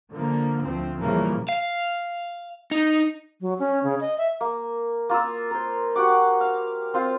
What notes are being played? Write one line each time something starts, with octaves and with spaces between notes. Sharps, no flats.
D3 F3 A#3
D2 F3 C4
A#2 C#3 E3 F3 G3 A#3
F5
D#4
F#3
C#4
C#3
D#5
E5
A#3
A#3 F4 D#6 E6
A#4 C5
F#4 G4 F#5 D6
F5
C4 F4 C5 F5